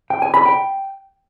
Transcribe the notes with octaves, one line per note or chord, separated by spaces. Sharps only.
G5
G#5
B5
G5